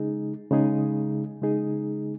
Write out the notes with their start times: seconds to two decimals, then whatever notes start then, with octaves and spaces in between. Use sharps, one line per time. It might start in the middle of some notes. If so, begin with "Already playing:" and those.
Already playing: C#3 G#3 D#4 G#4
0.51 C#3 G#3 D#4 G#4
1.42 C#3 G#3 D#4 G#4